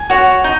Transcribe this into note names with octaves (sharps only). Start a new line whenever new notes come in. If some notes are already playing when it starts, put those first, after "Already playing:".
Already playing: G#5
F#4 C#5
D#4